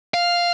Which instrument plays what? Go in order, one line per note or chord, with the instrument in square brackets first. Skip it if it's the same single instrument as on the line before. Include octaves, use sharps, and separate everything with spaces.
[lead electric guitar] F5